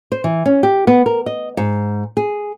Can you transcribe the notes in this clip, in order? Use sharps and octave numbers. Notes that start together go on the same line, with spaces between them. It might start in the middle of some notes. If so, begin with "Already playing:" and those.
C5
E3
C#4
G4
B3
A#4
D#5
G#2
G#4